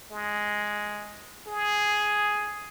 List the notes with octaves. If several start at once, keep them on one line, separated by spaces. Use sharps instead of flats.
G#3
G#4